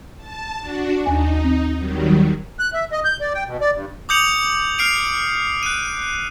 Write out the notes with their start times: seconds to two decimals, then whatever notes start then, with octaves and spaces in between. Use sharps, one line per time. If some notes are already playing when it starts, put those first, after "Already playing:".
0.18 A5
0.60 D4 F#4
1.06 D#2 D#4 G#5
1.44 C4
1.78 D#3 F#3 G3
2.59 F#6
2.73 E5
2.92 D#5
3.05 G6
3.21 D5
3.34 G5
3.47 B2
3.61 D5
3.74 G2
4.09 D6 D#6 G6 C#7 F7 F#7
4.78 F6 C7 D7 F7
5.63 F#6 D#7